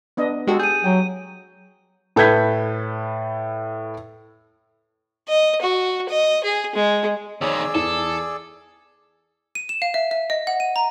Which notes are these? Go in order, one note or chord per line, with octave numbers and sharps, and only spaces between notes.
B3 D4 D#5
G#3 F#4 G4 A4
G#4 G6 D#7
F#3 G5
A2 A4 B4 G6 G#6 B6
D#5
F#4
D#5
G#4
G#3
F2 D#3 G#4 C#5 D5 E6
E2 E3 A4
D#7
E7
F5
E5
E5
D#5
F#5
D#7
A#5